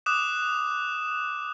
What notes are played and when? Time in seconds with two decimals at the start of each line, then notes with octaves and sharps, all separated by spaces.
0.06 D6 D#6 F#6 E7